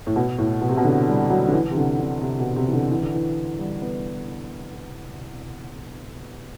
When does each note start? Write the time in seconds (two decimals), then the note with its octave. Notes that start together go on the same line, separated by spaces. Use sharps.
0.07 A2
0.16 B2
0.38 A2
0.61 B2
0.69 C3
0.77 B2
0.85 D3
1.08 G3
1.30 F#3
1.48 D3
1.53 E3
1.71 C3
1.76 D3
1.99 D3
2.21 C3
2.39 B2
2.56 C3
2.67 E3
2.73 D3
2.91 E3
3.02 D3
3.14 E3
3.59 G3
3.82 B3